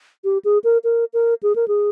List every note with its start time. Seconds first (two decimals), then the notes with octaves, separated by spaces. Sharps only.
0.24 G4
0.45 G#4
0.64 A#4
0.84 A#4
1.14 A#4
1.43 G#4
1.56 A#4
1.68 G#4